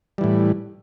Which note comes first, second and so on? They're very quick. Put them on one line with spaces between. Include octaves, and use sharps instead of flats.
G3 E3 A2